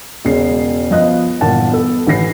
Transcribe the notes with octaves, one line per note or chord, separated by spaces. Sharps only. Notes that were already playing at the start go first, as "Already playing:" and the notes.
E1 C#3 G#3 C7
F3 B3 D#5 F#6
G1 A#2 E3 F#5 A5
B3 A4
A1 E3 B4 A#6 C7